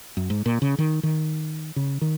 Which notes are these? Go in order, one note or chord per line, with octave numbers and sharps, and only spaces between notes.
F#2
G#2
A#2
C#3
D#3
D#3
C#3
D#3